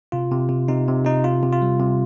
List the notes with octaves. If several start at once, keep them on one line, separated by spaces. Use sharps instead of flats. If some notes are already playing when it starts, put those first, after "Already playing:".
C3 F4
C3
C3
C3 D#4
C3
C3 D#4
C3 F4
C3
F4
G3
C3